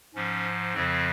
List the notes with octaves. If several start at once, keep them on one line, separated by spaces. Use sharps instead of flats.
G#2 F3 C#4
F2 C#3 F3 C4